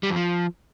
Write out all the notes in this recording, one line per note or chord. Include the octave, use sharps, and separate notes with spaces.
G3
F2
F3